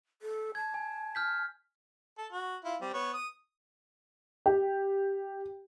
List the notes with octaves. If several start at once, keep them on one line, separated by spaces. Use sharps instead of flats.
A4
A5 G#6
G#5
F6 G6 B6
A4
F#4
E4 F4
G3 C4
B3 C#5
D#6
G4